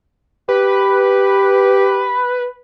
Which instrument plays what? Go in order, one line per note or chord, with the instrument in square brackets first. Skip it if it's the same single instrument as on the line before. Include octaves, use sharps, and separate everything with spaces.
[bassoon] G4 [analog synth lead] B4